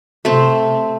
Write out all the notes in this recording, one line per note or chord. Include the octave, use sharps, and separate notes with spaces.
C3 A3 C4